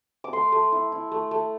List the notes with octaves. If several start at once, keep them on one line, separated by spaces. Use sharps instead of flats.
D6
A3 C6
A3
E4
E4
A3
A3